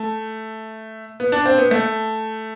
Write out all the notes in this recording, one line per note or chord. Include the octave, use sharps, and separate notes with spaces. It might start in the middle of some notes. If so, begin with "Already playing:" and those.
Already playing: A3
B3
D4
C4
B3
A3